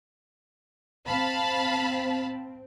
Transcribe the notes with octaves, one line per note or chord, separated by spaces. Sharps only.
C4 F5 A5 B5